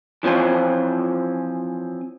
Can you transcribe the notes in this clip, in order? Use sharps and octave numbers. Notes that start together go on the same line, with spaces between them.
E3 F3 C4 C#4 F4